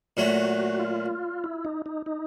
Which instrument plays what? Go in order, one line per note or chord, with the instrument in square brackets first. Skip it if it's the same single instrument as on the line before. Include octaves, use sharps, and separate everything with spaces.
[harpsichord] A#2 F#3 A3 [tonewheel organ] F#4
[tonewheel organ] F4
E4
D#4
D#4
D#4